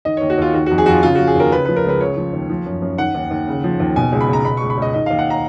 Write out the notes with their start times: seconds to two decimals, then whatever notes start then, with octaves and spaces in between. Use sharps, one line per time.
0.05 D#3 D#5
0.17 D#2 C#5
0.30 F#4
0.38 D#2 F4
0.54 D#3 F#4
0.66 F2 F#4
0.78 G#4
0.86 F2 F4 F#4
1.03 C#3 F4
1.15 F3 F#4
1.27 G#4
1.35 D#2 A#4
1.52 C#3 B4
1.65 F3 B4
1.76 A#4
1.84 C#2 B4
2.00 C#3 C#5
2.17 F3
2.33 D#2
2.50 F3
2.66 F#2
2.82 F#2
2.98 D#3 F#5
3.14 D#2
3.31 D#2
3.48 C#3
3.64 F3
3.80 D#2
3.96 B2 G#5
4.12 C#2
4.21 B5
4.29 C#2 A#5
4.45 B2 B5
4.57 C#2 C#6
4.70 B5
4.78 C#2 D#5
4.94 D#3 D#5
5.06 D#2 F5
5.19 F#5
5.30 A#5